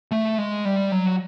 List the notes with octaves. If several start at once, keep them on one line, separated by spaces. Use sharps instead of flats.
A3
G#3
G3
F#3